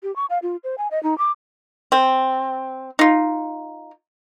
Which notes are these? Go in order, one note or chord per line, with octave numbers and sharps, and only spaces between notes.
G4
C#6
F5
F4
C5
G#5
D#5
D#4
D6
C4
D#4 F4